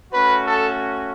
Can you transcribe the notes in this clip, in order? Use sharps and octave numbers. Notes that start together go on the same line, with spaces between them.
A3 C#4 F#4 B4
A4